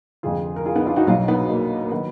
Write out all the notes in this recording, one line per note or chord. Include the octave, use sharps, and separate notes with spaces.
F1 F2 D3 F4 G#4
A#4
F4 G#4
B3 D#4
D4 F4
D#4 F#4
B1 B2 F#3 D4 F4
B3 D#4
A#3 D4
A#3
D#3 F#3 B3